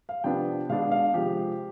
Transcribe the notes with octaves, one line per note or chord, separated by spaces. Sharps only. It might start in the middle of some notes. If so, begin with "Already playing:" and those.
F5
C3 F3 B3 D4 G5
B2 G#3 B3 D4 F5
F5
C3 F3 G#3 G4